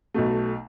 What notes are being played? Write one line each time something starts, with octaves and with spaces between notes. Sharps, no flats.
B1 B2 A3